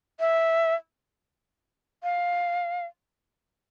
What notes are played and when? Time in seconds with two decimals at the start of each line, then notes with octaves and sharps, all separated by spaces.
0.20 E5
2.03 F5